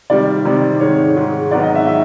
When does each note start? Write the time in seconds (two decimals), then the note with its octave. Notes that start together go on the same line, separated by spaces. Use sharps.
0.10 C3 D#3 G3 D5
0.45 C3 D#3 G3
0.80 G#2 D#3 G#3 C#5
1.16 G#2 D#3 G#3
1.51 G#2 D#3 F#3 B3 D5
1.63 D#5
1.75 E5
1.87 D#3 E5